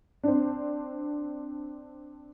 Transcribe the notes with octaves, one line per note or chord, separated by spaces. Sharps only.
C4 D4